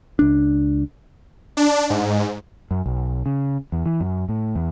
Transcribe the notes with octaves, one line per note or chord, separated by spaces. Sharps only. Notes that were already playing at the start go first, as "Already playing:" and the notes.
C#2 D4
D4
G#2
F#2
B1
C#3
E2
E3
F#2
A2
E2